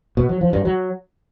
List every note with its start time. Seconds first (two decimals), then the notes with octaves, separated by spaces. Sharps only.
0.17 B2
0.29 F#3
0.41 F3
0.53 G2
0.65 F#3